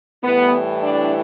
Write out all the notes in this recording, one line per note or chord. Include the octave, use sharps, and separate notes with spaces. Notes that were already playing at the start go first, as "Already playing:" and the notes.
A2 E3 G3 B3
D4